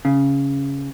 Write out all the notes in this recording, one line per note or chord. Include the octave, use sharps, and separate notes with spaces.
C#3